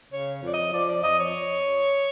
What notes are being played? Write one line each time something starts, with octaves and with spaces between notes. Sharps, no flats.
C#3 C#5
F2 D5
D#5
F3 D5
D5
F2 D#5
C#5